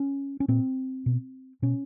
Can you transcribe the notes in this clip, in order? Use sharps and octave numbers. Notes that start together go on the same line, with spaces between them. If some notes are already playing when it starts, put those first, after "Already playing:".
Already playing: C#4
C#4
A#2 C4
B2
B2 C#4